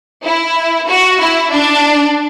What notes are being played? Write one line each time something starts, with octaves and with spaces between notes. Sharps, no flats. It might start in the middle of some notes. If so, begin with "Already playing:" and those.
E4
F#4
E4
D4